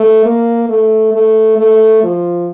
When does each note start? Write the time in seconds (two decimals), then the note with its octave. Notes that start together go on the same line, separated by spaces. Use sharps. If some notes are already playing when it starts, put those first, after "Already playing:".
Already playing: A3
0.25 A#3
0.69 A3
1.14 A3
1.58 A3
2.03 F3